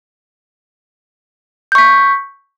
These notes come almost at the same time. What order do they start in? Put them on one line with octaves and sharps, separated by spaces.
G6 C#6 B6